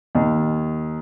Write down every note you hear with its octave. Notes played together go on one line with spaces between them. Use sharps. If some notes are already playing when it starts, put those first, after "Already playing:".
D#2